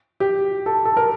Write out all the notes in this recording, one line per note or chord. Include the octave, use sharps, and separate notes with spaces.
G4
A4
A4
A#4